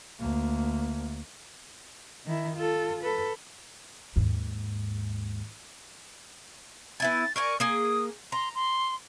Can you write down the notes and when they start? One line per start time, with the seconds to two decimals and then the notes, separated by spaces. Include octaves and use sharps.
0.20 D2 A#3
2.26 D#3 E4
2.56 F4 A4
3.04 A4 B4
4.16 D#2 G#2
7.00 B3 E4 G#5 A6
7.36 A#4 D5 G#5 C#6
7.60 A#3 G#4 D#6
8.32 A#5 C6
8.55 C6